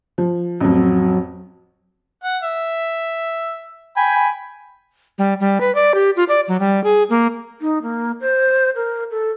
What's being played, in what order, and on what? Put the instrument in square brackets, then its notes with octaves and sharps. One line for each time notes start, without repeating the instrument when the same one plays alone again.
[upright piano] F3
[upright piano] A1 F2 [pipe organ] F#3
[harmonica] F#5
E5
G5 G#5 B5
[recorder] G3
G3
B4
D5
G4
F4
D5
F#3
G3
G#4
A#3
[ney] D#4
A#3
C5
A#4
A4